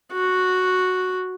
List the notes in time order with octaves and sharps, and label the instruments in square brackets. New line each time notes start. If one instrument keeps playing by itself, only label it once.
[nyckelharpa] F#4